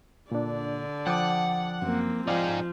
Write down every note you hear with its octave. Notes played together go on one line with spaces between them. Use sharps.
A#2 D3 D4 D5
F3 F#5 G5 A5 D6 D#6
F#2 A#3 C4
F3 D#4 G#4 D5 F5 G5